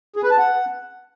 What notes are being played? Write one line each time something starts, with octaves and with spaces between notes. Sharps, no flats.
G#4
B4
A5
F#5